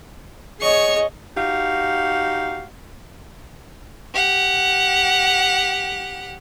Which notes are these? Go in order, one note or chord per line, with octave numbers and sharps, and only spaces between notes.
G#4 C#5 D#5 C#6
D#4 F#4 G4 F5
G4 F#5